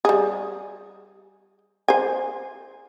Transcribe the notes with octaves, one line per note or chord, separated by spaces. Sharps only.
G3 G#4
C5 G#5